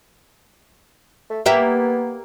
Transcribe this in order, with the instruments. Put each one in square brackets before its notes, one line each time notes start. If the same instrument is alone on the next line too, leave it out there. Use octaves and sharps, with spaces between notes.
[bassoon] A3
[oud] A#3 G4 E5 [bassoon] B3